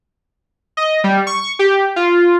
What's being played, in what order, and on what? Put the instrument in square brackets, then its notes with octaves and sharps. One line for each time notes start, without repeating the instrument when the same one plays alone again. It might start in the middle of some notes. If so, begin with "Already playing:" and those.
[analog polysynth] D#5
G3
C#6
G4
F4